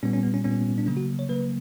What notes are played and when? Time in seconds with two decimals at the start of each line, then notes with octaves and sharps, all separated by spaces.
0.03 A#2 G3 B3 C#4
0.13 C#4
0.23 B3
0.34 C#4
0.44 A#2 G3 B3 C#4
0.78 D4
0.86 C#3 F#3 A#3 C#4
0.97 F#4
1.19 C#5
1.29 C#3 F#3 A#3 B4